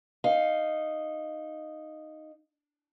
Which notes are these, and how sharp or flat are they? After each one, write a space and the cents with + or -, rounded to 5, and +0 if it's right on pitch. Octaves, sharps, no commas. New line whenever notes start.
D#4 -5 F5 +0